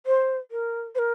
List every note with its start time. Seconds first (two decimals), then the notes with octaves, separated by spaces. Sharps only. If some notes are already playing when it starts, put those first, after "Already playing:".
0.06 C5
0.51 A#4
0.95 C5
0.99 A#4